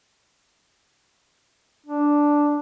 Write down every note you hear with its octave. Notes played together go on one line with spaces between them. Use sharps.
D4